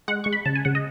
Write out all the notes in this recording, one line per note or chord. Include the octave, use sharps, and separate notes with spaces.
G#3 F#5
G#3 C#6
B5
C#3 A5
G#5
C#3 F#5
D#5